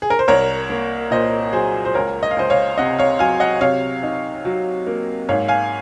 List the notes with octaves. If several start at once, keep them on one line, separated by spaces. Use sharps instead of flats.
G#4
A#4
C5
C2 A#4 C#5
A#3
A#2 C5 D#5
F#3 G#4 C5
C5
C#2 A#4 C#5
D#5
F5
C#2 C5 D#5
C#5 F5
C3 D#5 F#5
C#5 F5
F#3 F5 G#5
D#5 F#5
C3 C#5 F5
D#4
F#3
A#3
G#2 C#5 F5
F5 G#5